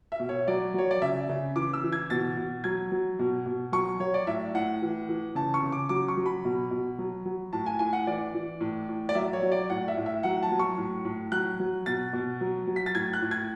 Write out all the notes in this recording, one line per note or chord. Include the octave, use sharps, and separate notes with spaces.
E5
B2
C#5
F#3 D5
F#3 C#5
D5
C#3 E5
C#3
E3 D6
E6
E3
G#6
B2 A6
B2
F#3 G#6
F#3
B2
B2
F#3 C#6
F#3 C#5
D5
A2 E5
A2 F#5
E3
E3
C#3 A5
C#6
C#3
D6
F#3 D6
C#6
F#3
B5
B2
B2
F#3
F#3
A2 A5
G#5
A2 G#5
F#5
E3 D5
E3
A2
A2
D5
F#3 E5
C#5
F#3
D5
A2 F#5
E5
A2
E5
F#3 F#5
A5
F#3
C#6
A2
A2
F#3 F#6
F#3
B2 A6
B2
F#3
F#3
B6
A6
A2 G#6
F#6
A2
G#6